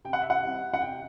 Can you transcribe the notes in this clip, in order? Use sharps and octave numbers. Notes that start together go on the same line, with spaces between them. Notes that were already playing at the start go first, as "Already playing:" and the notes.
C3 G5
F#5
E5
F#5
G3 C4 E4
F#5
C3 G5